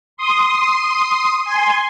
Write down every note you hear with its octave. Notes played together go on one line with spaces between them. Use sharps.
C6 D#6
G#5 C6